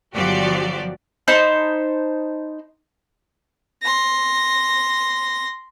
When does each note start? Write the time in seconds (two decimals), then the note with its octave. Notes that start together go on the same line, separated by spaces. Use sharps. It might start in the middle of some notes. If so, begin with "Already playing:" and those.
0.15 G1 F3 F#3 F#4 G4 D5
1.28 D#4 C5 A5 B5
3.83 C6 A#6